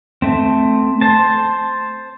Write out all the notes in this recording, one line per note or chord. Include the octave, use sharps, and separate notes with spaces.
A3 C4
C5 A5